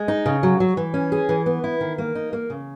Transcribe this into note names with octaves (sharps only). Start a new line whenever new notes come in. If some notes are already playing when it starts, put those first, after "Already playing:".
Already playing: G#3
D#4
C#3
F#3
F#3
E3
C#4
G#4
E3
B3
E4
D#3
A#3
D#4
A#3
C#3